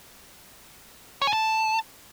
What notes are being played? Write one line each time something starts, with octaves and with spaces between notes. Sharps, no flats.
C#5
G#5
A5